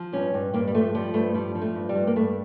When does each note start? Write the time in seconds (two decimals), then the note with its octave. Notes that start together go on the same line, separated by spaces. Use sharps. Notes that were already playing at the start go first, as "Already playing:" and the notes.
Already playing: F3
0.13 G2 C#4
0.34 G2
0.54 G2 A#3
0.67 G3
0.74 F3 A3
0.95 F3 G3
1.14 G2 A3
1.34 F3 G3
1.55 F3
1.61 A3
1.75 G2
1.89 G3
1.95 G2
2.07 A#3
2.16 G2 A3